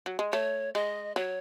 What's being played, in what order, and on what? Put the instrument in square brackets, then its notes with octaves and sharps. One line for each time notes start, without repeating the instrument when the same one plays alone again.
[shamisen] F#3
G#3
[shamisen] A3 [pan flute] C#5
[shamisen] G#3 [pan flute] D#5
[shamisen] F#3 [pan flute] C#5